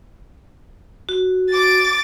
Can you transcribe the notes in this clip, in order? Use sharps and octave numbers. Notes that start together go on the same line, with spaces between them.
F#4
D6 A6